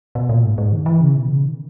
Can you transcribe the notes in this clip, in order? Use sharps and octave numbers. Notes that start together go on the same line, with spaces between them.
B2
A#2
G#2
G#2
D#3
E3
C#3
B2
C#3
D#3